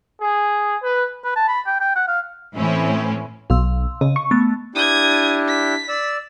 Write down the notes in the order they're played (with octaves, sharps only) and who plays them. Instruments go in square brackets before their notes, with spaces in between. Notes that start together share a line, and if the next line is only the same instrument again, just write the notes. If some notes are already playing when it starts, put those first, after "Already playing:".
[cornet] G#4
B4
[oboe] B4
A5
B5
G5
G5
F#5
F5
[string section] A2 E3 C4 C#4 E4
[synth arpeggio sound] B1 [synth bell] F5 C6 E6
[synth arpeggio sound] C#3 [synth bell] D#5
[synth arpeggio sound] C#6
[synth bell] A3 B3 A6
[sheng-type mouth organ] D4 E4 G4 [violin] D#6 G#6
[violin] B6
[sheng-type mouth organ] D5 E6